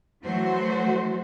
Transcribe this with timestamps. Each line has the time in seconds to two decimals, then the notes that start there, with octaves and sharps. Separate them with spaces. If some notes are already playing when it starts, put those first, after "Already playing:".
0.24 E3 F#3 A3 F#4 C5